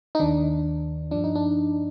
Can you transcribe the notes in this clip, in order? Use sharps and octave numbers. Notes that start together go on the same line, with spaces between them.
D#4
D#2 D#3 D4
G2 F3 D4
D#4
D4